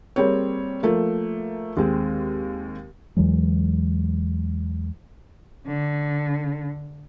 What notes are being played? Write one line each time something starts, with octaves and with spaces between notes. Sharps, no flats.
G3 A#3 C4 G#4 C#5
F3 A3 A#3
D#2 G#3 C4
E2 E3 F#3 G#3
D3